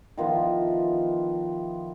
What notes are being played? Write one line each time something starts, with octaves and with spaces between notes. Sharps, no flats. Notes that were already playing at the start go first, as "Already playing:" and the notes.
D#3 F3 B3 E5